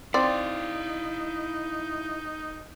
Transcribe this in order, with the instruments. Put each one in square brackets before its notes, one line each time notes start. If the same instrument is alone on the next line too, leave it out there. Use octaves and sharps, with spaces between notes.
[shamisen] C4 [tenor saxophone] D#4 [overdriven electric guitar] E4 F5 [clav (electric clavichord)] D5